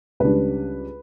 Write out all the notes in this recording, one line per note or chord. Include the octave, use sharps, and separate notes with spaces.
C#2 C#3 G3 D4 B4